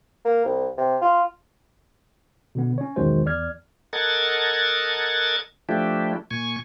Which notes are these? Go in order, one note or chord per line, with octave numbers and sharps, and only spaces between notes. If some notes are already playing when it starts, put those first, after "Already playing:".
A#3
C2
C3
F4
B2 D3 B3
C#4 C#5
B1 E2 D#3 G#3 F#4 C5
E2 D5 F6 G#6
A4 A#4 D#5 F#5 G#6 A6
F3 A3 D4 E4 G4
A#2 G#5 C#6